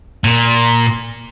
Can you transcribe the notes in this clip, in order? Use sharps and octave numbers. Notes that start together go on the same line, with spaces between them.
A#2